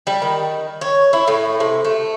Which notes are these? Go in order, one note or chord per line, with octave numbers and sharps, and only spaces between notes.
G3
D#3
C#5
E4
A2
C3
A3